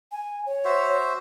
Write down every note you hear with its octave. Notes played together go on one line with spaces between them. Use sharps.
G#5
C#5
F#4 C5 E5